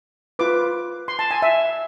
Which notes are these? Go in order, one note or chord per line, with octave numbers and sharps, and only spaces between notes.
F4 B4 D6
C6
A5
G#5
E5